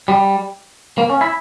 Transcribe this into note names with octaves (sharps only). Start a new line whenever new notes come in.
G3
A#3
C#4
E4